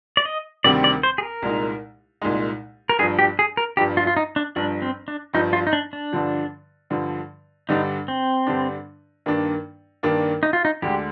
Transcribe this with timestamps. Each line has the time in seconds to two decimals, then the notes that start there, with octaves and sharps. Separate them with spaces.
0.17 D5
0.25 D#5
0.64 D2 C3 D#3 G3 C4 D5
0.84 D5
1.03 C5
1.18 G#4
1.23 A#4
1.42 C2 A#2 G#3 D#4
2.22 C2 A#2 G#3 D#4
2.89 A#4
2.99 G1 G2 F3 G#4
3.19 G4
3.39 G#4
3.57 A#4
3.77 G1 G2 F3 G4
3.97 F4
4.07 F4
4.17 D#4
4.36 D4
4.56 G1 G2 F3 D4
4.82 C4
5.08 D4
5.34 G1 G2 F3 D#4
5.53 F4
5.67 D#4
5.73 D4
5.93 D4
6.13 G2 D3 F3
6.90 G2 D3 F3
7.69 G2 D3 G3 D4 D#4
8.08 C4
8.47 G2 D3 G3 D4
9.26 G2 D#3 A#3 D4
10.03 G2 D#3 A#3 D4
10.43 D#4
10.53 F4
10.65 D#4
10.82 D2 D3 G#3 G4